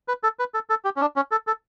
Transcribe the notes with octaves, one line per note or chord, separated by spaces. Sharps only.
B4
A4
B4
A4
A4
G4
C#4
D4
C#4
A4
A4